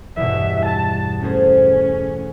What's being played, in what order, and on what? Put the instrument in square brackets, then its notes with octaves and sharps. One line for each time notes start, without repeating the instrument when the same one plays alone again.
[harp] E2 G2 B2 [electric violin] E5
[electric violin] A5
[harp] A3 G#4 C5 [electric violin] C#4